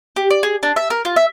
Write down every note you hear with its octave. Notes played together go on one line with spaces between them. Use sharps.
G4
D5
G#4
D4
E5
A#4
F4
E5